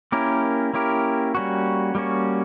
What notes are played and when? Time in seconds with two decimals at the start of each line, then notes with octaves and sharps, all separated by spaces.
0.12 A#3 C#4 E4 G4 A#4
0.74 A#3 C#4 E4 G4 A#4
1.35 G3 A#3 C#4 F#4
1.95 G3 A#3 C#4 F#4